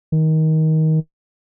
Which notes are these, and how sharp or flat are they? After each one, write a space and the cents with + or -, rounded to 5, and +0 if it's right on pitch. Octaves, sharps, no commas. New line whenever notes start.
D#3 +20